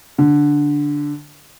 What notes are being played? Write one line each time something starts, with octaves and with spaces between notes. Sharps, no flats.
D3